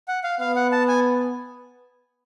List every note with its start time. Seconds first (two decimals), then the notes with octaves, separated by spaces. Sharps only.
0.08 F#5
0.24 F5
0.40 B3 F5
0.56 F#5
0.72 A5
0.88 G#5